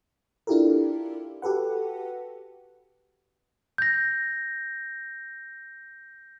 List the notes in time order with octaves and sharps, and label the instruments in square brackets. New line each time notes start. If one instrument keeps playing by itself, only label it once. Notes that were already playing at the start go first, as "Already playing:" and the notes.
[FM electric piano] D4 E4 F4 G4 A4 A#4
F#4 G4 A4 B4 F#5
[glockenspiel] G6 A#6